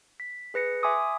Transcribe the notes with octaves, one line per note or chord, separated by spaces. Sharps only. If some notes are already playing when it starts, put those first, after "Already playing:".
B6
G#4 B4 A#6 C#7
E5 G#5 C6 D6 D#6